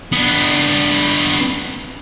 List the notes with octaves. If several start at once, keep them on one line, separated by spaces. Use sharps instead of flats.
B3 D4